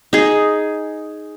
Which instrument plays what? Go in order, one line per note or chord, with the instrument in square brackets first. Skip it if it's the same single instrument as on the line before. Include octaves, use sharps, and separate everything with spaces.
[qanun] D#4 G#4